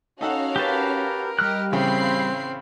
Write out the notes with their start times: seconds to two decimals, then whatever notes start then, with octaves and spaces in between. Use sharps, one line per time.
0.21 C#4 D#4 F#4 A4 F5 F#5
0.56 G4 A#4 B4 A5
1.39 G3 G4 D#5 F6 F#6
1.72 A1 C#3 C4 F5 G5 B5 C7